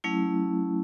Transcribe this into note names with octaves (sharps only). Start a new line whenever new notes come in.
F#3 A3 C#4 E4